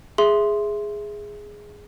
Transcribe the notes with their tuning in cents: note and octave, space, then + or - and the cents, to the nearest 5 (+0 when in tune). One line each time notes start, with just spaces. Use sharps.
G#4 +0 E5 +0 C6 +0